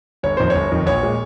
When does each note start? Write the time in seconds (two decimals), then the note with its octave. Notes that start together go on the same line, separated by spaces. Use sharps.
0.23 G1 C#5
0.37 F2 D#3 C5
0.50 G1 C#5
0.72 F2 D#3
0.86 A#1 C#5
1.03 A#2 G#3